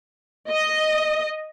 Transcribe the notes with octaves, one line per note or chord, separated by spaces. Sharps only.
D#5